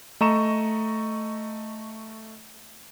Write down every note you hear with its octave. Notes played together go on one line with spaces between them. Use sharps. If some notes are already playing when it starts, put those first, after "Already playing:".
A3 D#5 A#5 C#6 E7